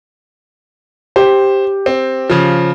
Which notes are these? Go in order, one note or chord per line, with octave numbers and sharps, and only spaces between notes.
G4 C5
C4
C#3 F3